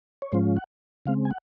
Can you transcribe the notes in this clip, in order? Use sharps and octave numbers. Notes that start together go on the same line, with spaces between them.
C#5
G#2 F3 G#3 C#4 F4 C5
F#5
C#3 G#3 C4 F5
G#5
F#5